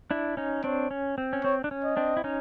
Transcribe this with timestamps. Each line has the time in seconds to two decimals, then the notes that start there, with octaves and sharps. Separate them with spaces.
0.11 D4 E4
0.37 C#4 D#4
0.64 C4 D4 C#5
0.91 C#4
1.18 C4
1.33 C#4
1.44 C4 C#5
1.64 D4
1.71 C#4
1.84 D#5
1.97 C4 D4
2.17 E4
2.24 C#4 D#4